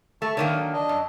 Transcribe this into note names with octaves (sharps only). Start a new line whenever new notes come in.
A3 A5 C#6
D3 D#3 A#3 C#5
F#3
D4 D#5
F#2